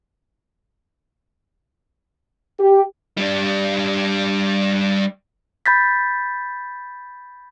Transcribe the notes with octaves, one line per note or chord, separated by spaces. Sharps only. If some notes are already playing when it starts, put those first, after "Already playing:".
G4
G3 D4
B5 G6 A6 B6